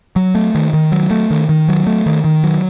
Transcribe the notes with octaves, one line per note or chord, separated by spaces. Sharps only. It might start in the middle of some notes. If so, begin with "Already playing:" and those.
F#3
A3
D#3
D#3
F#3
A3
D#3
D#3
F#3
A3
D#3
D#3
F#3